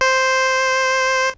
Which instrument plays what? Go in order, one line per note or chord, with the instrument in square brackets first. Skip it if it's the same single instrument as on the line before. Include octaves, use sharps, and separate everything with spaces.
[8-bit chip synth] C5